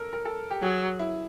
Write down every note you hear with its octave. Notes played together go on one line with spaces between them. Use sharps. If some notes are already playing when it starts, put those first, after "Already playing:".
Already playing: A4 A#4
A#4
A4
G4
F#3 G#4
E4